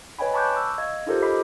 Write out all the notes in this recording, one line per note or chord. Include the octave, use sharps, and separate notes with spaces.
B4 C#5 D#5 G5 G#5 B5
A5 B5 C#6 D6 F#6 G6
C#6 E6
D#5 F5 G#6
D#4 F4 G4 A4 A#4 C5
D#5 B5 D6 B6 C7